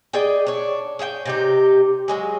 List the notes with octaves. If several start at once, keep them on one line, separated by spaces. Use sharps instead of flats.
G#4 D5 D#5 G5
D4 C#5
G#4 C#5 E5 G5
C3 D#4 G4
F#3 G#3 G#4